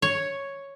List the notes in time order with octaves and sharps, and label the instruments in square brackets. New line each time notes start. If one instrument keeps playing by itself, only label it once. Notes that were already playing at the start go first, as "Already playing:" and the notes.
[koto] C#5